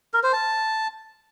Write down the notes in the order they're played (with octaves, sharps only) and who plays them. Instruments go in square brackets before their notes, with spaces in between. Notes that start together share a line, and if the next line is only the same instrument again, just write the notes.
[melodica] A#4
C5
A5